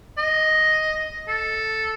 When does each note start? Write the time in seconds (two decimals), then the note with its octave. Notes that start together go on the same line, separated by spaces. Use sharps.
0.18 D#5
1.28 A4